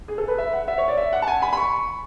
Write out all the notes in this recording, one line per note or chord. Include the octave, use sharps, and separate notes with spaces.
G#4
A4
B4
E5
F#5
E5
C#5
D5
E5
F#5
A5
G#5
B5
B5
C#6